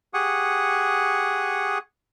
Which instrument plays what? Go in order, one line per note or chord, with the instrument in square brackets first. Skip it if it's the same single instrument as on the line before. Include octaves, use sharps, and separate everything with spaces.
[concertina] G4 G#4 F#5 C#6 D#6